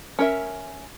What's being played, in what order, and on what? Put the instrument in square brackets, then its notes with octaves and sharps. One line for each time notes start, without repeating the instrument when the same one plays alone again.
[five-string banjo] C#4 A#4 E5